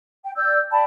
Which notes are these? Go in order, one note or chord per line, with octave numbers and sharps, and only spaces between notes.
G5
D5 E6 G6
D5 G5 A5 B5